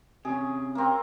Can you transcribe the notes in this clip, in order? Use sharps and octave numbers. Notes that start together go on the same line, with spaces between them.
C3 C#4 G#4
A#3 C4